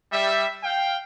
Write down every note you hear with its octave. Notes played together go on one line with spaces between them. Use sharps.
G3 E5
F5 G5